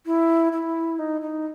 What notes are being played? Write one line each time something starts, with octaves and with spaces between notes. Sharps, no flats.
E4
E4
D#4
D#4